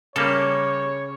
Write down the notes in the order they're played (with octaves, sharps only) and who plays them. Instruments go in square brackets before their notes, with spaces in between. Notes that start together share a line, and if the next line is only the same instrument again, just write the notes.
[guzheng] C#3 [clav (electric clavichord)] G3 A#3 A4 [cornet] C#5